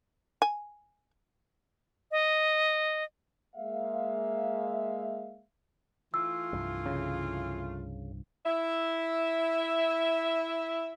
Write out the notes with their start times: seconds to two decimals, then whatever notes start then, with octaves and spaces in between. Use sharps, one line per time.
0.42 G#5
2.11 D#5
3.56 G#3 A#3 E5 F5
6.14 E3 A3 F4 E6
6.53 C2 G2 F3
6.86 C#3
8.45 E4 E5